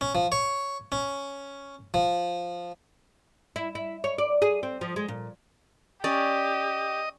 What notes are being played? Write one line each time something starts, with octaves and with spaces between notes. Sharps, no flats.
C#4
F3
C#5
C#4
F3
E4
E4
C#5
D5
G#4
C4
F3
G#3
A#2
C#4 G4 D5 D#5